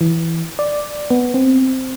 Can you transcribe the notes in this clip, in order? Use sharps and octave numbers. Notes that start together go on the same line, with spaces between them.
E3
D5
B3
C4